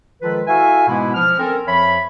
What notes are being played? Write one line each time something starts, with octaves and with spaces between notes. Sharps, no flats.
D#3 F3 G#3 F4 A4 B4
E4 F#4 A4 E5 F5 G#5
G#2 B2 E3 G#3 B3 E4
F3 F6
C4 C#4 A4 A#4
F2 F3 C#5 E5 B5